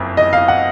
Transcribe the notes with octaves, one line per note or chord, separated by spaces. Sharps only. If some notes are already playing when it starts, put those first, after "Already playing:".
Already playing: F#1 F2
D#5
F5
F#5